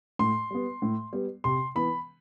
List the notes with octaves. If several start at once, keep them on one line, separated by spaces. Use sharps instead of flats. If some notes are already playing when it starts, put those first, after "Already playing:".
A2 C6
G3 B3
A2
G3 B3
C3 C6
E3 B3 B5